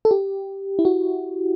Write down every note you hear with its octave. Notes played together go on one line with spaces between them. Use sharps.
A4
G4
E4
F#4